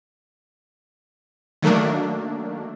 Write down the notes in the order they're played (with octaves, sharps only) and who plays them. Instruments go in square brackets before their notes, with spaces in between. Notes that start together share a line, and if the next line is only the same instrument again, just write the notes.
[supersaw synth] D#3 F#3 A3 A#3 D4